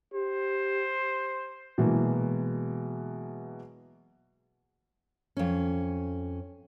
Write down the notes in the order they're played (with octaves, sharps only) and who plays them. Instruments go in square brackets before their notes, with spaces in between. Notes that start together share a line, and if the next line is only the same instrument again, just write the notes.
[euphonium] G4 [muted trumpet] C5
[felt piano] B2 E3 F#3 G#3 A#3
[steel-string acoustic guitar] F2 C#4